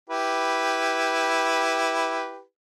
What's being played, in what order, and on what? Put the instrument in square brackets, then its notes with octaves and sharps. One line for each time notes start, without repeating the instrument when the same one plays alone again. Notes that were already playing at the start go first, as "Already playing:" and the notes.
[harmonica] E4 G4 B4